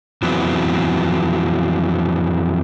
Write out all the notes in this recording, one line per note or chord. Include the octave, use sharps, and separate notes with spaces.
F2 E3 F#3 B3 C4